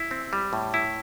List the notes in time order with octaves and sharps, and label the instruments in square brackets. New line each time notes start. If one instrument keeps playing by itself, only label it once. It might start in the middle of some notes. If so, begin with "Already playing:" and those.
Already playing: [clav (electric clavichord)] E4
C4
G3
A2
E4